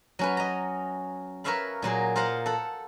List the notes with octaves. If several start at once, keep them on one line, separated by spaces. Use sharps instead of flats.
F#3 C#4 B4
D#5 A#5
A#4 B4 C#5 E5 F5 B5
A#2 F#3 A#3 G#4
F4 A#4 C5 F5 F#5
A4 F#5